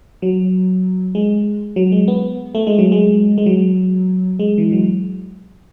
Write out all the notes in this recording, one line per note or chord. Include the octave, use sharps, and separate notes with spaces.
F#3
G#3
F#3
G#3
B3
A3
G#3
F#3
G#3
G#3
F#3
G#3
E3
F#3